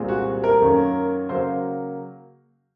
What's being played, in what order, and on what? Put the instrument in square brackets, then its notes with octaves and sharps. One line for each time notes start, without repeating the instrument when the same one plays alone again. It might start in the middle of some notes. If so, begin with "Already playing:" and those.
Already playing: [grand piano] C2 A#2 G#3 C4
[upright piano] F#4
A#4
[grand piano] F#2 D#3 A#3 C#4
[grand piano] C#3 F#3 A#3 [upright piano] C5